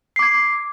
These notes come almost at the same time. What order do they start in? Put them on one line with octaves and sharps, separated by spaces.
C7 D6 G#6